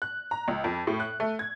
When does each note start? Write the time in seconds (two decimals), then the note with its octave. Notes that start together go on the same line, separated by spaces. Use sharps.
0.02 F#6
0.31 A#5
0.48 C#2
0.64 F2
0.87 A2
1.00 F#6
1.20 A3
1.39 G#6